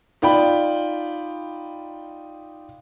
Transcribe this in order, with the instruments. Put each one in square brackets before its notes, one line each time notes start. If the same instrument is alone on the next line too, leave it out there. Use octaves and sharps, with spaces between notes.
[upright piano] D#4 F4 D5 G5 B5